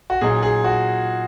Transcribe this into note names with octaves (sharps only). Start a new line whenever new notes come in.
F#4
A#2 F#3 D#4 G#4
G#4
F#4